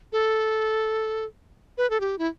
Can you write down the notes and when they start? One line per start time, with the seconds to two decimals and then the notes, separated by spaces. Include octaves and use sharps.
0.12 A4
1.78 B4
1.90 A4
2.00 G4
2.19 E4